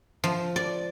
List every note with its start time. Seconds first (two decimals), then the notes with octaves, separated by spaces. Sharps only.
0.24 F3
0.56 D5